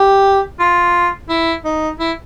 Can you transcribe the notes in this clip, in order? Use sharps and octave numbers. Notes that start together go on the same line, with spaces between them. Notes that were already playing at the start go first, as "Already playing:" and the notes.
Already playing: G4
F4
E4
D#4
E4